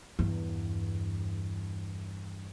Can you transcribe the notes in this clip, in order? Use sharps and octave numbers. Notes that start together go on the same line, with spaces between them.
E2 G2